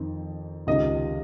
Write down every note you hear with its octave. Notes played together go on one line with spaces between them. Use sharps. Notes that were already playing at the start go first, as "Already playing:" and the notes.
Already playing: F2 D#3
C#2 C3 D#3 D#5